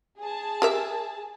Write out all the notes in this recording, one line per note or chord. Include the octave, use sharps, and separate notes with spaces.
G#4 A5
G4 A#4 E5